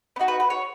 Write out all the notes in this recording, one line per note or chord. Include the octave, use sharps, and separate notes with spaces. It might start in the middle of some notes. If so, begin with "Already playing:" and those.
B3
D#4 F#4
B4
B4
C#5